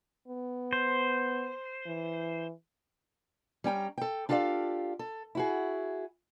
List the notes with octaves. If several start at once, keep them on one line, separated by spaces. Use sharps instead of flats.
B3
C5
E3
G3 C#4 G5 A#5
A4 G5
D4 F4 G4 A4 D5 F5
A4
E4 F#4 G#4